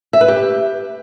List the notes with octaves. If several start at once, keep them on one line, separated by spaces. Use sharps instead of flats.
E5
B4
G4